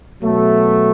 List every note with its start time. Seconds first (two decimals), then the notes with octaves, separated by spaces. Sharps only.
0.22 B2 F#3 A3